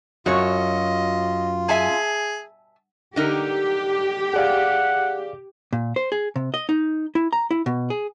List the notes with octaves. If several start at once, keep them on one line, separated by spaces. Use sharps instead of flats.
F#2 F4 F#4 C#5 D#5
G#4 E5 G#5 A5
D3 D#4 G4 A#4
G#4 D5 F5 F#5
A#2
C5
G#4
C3
D#5
D#4
E4
A#5
E4
B2
G#4